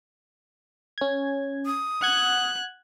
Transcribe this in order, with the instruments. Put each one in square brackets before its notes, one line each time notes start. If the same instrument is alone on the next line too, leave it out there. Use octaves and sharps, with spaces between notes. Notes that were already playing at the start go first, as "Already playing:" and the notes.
[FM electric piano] C#4 G#6
[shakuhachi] D#6
[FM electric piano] F#5 G#6 [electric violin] F#6